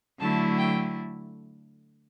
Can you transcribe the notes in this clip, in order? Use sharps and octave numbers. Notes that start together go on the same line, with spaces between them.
D3 F#3 A3 E4 A5
G5